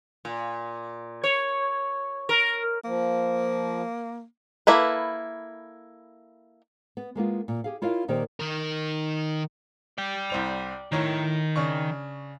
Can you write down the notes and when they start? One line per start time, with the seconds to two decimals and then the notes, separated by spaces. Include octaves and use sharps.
0.25 A#2
1.24 C#5
2.29 A#4
2.84 F3 A#3
4.67 A#3 E4 A4 B4
6.97 B3
7.15 G#3 A#3 B3 F4
7.48 A#2
7.64 G4 G#4 F5
7.82 E4 F4 A#4 C#5 D#5 F5
8.08 A#2 D#3 A#3 G4 C5
8.40 D#3 A#4
9.98 D5 G5
10.30 C2 C5 F7
10.92 A2 D#3 C#5 A#5
11.56 C#3 D4 C#6